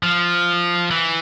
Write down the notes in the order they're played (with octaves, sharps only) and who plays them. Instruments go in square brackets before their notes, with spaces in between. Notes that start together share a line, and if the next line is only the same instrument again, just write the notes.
[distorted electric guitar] F3
E3